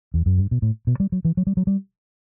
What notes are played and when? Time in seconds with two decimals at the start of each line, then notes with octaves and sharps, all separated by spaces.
0.14 E2
0.26 F#2
0.38 G2
0.51 B2
0.62 A2
0.87 B2
1.00 G3
1.12 F#3
1.25 E3
1.37 F#3
1.47 G3
1.57 F#3
1.67 G3